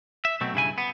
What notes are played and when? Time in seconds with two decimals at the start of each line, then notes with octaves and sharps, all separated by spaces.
0.25 E5
0.41 B2 F#3 A3 C4
0.54 G2 C#3 E4 G#5
0.78 B3